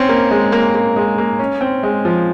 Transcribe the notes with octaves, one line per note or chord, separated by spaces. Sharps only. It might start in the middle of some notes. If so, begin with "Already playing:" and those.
Already playing: C4 C#4
A#3
G#3
A#3
A#3
G#3
A#3
C#4
C4
G#3
F3